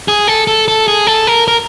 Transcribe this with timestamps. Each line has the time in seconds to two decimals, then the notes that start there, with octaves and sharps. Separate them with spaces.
0.08 G#4
0.27 A4
0.47 A4
0.68 A4
0.88 G#4
1.07 A4
1.27 A#4
1.48 A#4